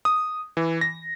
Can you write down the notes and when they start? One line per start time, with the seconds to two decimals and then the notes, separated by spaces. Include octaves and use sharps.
0.05 D#6
0.57 E3
0.81 A#6